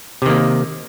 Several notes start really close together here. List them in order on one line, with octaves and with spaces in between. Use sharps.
C3 D#3 A#3